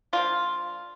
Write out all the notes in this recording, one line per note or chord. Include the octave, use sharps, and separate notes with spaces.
F3 A#3 D4 F4